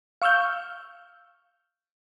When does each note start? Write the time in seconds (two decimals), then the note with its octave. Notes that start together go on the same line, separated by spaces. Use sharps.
0.22 F5 C#6 E6 F6 G6